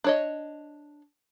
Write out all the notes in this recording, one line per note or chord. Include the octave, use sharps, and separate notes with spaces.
D4 C#5 D#5